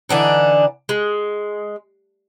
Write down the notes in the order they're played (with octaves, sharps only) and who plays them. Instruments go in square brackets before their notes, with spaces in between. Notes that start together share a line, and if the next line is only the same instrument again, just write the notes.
[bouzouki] D3 E3 D4 D#4
G#3